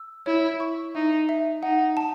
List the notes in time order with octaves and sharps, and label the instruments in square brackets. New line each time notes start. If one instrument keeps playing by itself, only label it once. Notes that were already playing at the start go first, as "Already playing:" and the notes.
Already playing: [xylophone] E6
[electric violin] E4 [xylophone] C#5
[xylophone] C#6
[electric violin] D#4 [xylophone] E5
[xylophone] E5
[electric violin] D#4 [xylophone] F#5
[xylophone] A5